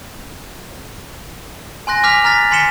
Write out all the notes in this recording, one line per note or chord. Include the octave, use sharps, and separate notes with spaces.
G#5 C6 F#6 A#6
G#5 D6 F6 F#6 B6 F7
A#5 F6 A6 B6
G#5 C6 B6 C#7 E7 G7